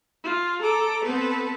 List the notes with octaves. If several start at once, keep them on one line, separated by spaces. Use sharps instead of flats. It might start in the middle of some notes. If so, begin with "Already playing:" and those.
F4
A4 A#5 D6
B3 C4 A4 B4